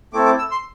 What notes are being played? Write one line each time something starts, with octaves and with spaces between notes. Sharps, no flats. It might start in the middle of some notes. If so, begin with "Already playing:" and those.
A3 C4 E4 A4 D6
D6
E6
C6